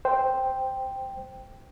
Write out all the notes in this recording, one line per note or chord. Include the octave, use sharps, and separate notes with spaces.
C5 G5